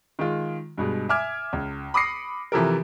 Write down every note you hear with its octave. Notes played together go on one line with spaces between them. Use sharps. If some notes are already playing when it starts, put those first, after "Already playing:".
D#3 G#3 F4
G2 B2 G#3
E5 G#5 D6 F6 G#6
C#2
B5 D6 D#6 A#6 C7 C#7
C3 E3 F3 G4 A4 A#4